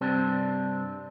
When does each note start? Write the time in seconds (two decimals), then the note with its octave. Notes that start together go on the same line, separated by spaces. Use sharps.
0.01 G2 C3 C4 D4